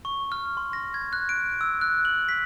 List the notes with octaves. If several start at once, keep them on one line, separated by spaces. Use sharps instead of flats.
C#6
F6
C6
A#6
G#6
F#6
D7
E6
F#6
F#7
B6